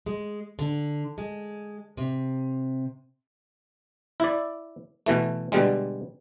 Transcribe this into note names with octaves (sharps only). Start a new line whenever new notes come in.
G#3
D3
G#3
C3
E4 D5
B2 E3 A3
B2 D3 G3 G#3